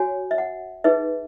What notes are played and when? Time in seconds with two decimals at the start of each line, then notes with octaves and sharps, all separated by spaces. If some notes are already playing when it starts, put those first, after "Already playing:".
Already playing: F#4 C#5 G#5
0.31 E5
0.38 F#5
0.84 D#4 G#4 B4 E5